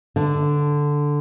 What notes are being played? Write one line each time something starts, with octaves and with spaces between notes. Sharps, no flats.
D3